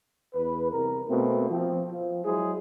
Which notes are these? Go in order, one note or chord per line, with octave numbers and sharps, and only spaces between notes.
E2 B4
C2 A#4
B2 A3 A#3 C4
F3 C4
F3
F#3 G#3 E4 G#4 C5